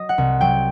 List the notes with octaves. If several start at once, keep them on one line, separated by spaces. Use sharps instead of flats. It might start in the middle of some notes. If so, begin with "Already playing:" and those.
Already playing: F#3 D#5
F#5
C2
F#3 G5